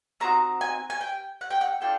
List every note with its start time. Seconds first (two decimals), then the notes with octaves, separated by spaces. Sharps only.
0.20 A3 C4 D#4 F#4 A#5
0.61 G#5
0.90 G#5
1.01 G5
1.41 F#5
1.50 G5
1.61 F#5
1.81 D4 F4 A4 G5